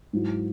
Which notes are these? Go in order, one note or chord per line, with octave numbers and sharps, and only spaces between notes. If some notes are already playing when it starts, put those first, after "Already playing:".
G#2 F#3 E4